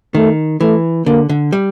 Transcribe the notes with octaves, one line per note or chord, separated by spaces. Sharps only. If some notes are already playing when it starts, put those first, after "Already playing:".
D#3 A3
E3 A3
D3 A#3
D3
G3